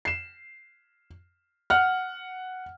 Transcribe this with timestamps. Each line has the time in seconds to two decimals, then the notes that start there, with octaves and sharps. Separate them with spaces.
0.05 C7 E7
1.70 F#5 F6